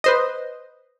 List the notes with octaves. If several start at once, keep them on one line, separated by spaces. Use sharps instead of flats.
B4 C5 D#5